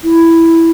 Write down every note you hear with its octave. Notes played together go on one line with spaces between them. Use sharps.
E4